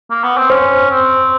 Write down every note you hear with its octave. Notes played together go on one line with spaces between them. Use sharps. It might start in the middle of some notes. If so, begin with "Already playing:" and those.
A#3
B3
C4
C#4 C5
C4